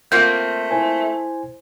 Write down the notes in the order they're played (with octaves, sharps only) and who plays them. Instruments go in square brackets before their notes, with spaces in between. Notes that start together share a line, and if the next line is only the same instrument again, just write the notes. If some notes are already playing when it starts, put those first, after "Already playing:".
[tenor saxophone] A3 [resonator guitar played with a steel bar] A#3 C4 F4 [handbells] G6
[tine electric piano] E4 C5 G#5